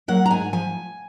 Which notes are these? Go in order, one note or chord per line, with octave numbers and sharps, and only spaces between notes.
F#3 A#3 F#5
A#5
G#2 G#5
F3 G#5